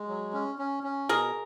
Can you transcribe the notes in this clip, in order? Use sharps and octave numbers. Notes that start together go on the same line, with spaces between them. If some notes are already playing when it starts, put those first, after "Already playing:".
Already playing: G#3
F#3
C#4
C#4
C#4
B2 G#4 A#4